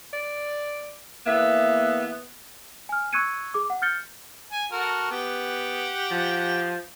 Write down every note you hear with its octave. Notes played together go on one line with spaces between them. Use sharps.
D5
E2 A#3 B3 E5
G#5 F6
C#6 E6 F#6 G#6 C#7 D#7
G#4 D6
F#5
F6 G6 A6 C#7 G7
G#5
F#4 A4 A#4
B3 G4 F#5
F3